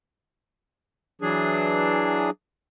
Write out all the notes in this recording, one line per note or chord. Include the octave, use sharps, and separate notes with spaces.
E3 F#3 D4 G#4